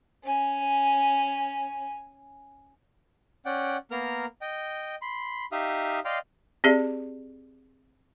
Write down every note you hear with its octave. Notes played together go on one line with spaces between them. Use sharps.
C#4 G#5
C#4 D5 F#5 G5
A#3 B3 A#4 A#5 F6
D#5 G5
B5 C6
D#4 G4 E5 F5 D#6
D5 D#5 F5 G5 C6 F6
C4 G4 G#4 D5 E5